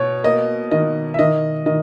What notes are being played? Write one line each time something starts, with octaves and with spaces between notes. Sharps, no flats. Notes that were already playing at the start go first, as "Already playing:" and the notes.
Already playing: B2 C#5
A#3 D#5
D#3 D#5
E5
D#3 D#5
D#3 D#5